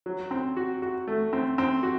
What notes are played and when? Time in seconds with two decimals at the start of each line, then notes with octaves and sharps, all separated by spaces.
0.06 F#3
0.31 C4
0.57 F#4
0.82 F#4
1.08 A3
1.33 C4
1.58 C4
1.83 F#4